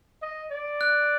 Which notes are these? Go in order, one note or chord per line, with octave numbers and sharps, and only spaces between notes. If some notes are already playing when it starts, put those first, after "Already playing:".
D#5
D5
F#6